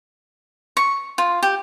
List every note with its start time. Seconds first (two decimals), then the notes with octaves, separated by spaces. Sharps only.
0.77 C#6
1.18 F4
1.43 G4